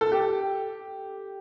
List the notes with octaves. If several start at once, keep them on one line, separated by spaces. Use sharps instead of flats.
A4
G4